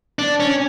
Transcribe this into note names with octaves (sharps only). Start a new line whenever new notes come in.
D4
C#4